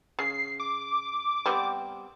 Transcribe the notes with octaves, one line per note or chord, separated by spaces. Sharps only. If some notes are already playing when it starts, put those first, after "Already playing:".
C#3 C7
D6
G3 B3 C4